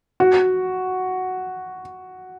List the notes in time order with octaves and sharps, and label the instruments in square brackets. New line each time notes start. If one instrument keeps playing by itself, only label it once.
[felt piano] F#4